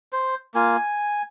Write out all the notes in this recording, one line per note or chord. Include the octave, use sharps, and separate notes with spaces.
C5
A#3 F4 G#5